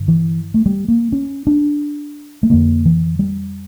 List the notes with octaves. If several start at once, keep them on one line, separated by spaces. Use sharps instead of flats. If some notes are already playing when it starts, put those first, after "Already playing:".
Already playing: G2 D3
E3
A3
G3
A#3
C#4
D4
A3
F2 D3 A#3
E3
G3